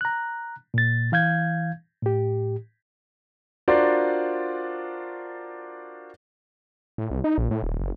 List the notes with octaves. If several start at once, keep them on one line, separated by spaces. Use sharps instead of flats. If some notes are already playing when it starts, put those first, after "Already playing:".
A#5 F#6
A#2 A6
E3 F5 G6 G#6
A2 G4
D4 F4 F#4 A#4 C5 D5
A2
C2
D#4
A#1
A2
D#1
F#1